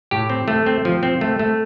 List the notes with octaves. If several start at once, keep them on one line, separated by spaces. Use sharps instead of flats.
A2 G4
C4
A3
C4
F3
C4
A3
A3